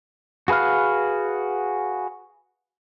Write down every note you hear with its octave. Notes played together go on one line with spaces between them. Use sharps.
F#4 G#4 B4 F5 F6